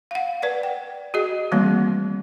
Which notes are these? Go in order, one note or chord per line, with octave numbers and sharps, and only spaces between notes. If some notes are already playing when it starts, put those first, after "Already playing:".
F5 F#5
B4 D5 F#5
G5
F#4 G#4 D#5
D#3 E3 G3 A3 A#3 C4